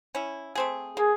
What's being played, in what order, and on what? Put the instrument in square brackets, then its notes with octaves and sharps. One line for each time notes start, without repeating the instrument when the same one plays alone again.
[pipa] C#4 E4
A3 C4 G#4
[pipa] A#3 [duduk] G#4